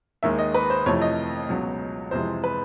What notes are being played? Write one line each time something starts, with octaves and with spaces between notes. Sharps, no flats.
D#2 D#3 G#3 E5
D#5
B4
C5
F2 C3 E3 A3 C#5
D#5
C#2 B2 F#3
F2 C3 E3 G#3 C5
B4